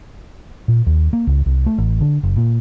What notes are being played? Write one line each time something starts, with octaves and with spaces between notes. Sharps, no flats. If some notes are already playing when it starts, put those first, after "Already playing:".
A#2
D#2
A#3
C#2
C2
A3
A1
D3
F#1
A#2